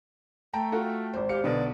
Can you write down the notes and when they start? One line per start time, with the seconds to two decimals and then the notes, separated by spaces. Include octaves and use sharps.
0.53 A3 G5 A5 A#5
0.72 F4 F#4 A4
1.13 G#1 C5
1.29 G4 F5 C#7
1.44 B1 B2 D3 F#3 B3 D5